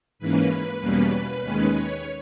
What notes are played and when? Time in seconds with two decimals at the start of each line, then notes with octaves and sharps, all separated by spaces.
0.19 G#2 E3 A#3 C#4 B4
0.81 E2 B2 G3 A#3 C#4
1.42 D#2 D#3 G#3 C#4 B4
1.73 C#5